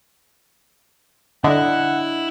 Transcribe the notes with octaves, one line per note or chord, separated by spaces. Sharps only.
D3 D4 E4 D#5 F#5